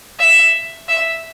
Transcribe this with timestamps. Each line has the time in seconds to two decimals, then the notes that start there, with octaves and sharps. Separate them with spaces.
0.19 E5
0.89 E5